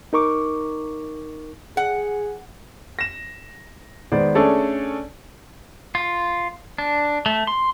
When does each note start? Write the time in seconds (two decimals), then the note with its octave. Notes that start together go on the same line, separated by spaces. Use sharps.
0.13 D#4 A#4 C#6 D6
1.77 G#4 F#5
2.99 A#6 E7
4.12 D#3 G#3 B3 C5 D5
4.35 A3 C#4 D4 G#4 A4 D5
5.95 F4
6.78 D4
7.26 A3
7.47 C6